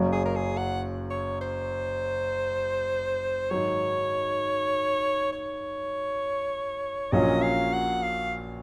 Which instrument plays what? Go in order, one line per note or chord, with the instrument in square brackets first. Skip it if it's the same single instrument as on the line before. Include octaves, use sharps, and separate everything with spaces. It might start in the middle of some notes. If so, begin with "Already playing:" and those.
Already playing: [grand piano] F#1 F#2 C#3 F#3
[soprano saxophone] G#4
A#4
G#4
F#5
C#5
C5
[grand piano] G#2 D#3 F#3 [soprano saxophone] C#5
[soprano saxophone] C#5
[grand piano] A#1 A#2 F#3 C#4 F4 [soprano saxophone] D#5
[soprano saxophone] F5
F#5
F5